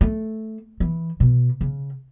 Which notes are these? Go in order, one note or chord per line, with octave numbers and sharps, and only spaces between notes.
A3
E3
B2
C#3